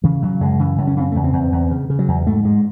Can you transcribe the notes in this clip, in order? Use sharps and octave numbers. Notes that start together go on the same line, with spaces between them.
C#3 E3
C#3 F#3
F#2 G#3
C#3 E3
F#2
C#4
C#3 C4
E2 A3
C4
E2
E2
C#3
C#3
F#3
E2
G#2 A3
G#2 G#3